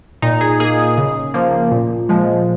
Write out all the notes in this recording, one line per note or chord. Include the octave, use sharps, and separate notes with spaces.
A#2 D#4
G#4
A#3 G#4
C#3
F3 A#3
A#2
F3 G#3